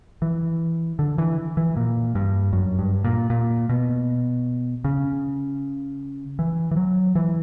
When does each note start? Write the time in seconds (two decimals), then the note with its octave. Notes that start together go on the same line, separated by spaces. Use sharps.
0.22 E3
0.99 D3
1.18 E3
1.57 E3
1.77 A#2
2.15 G2
2.53 F#2
2.79 G2
3.04 A#2
3.30 A#2
3.69 B2
4.84 C#3
6.39 E3
6.71 E3
6.77 F#3
7.15 E3